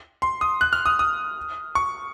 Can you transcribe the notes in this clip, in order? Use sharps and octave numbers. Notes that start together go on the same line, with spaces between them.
C6
D#6
F#6
F6
D#6
D#6
C#6